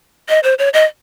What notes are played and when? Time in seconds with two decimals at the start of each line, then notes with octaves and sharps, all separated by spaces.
0.29 D#5
0.44 C5
0.59 C#5
0.74 D#5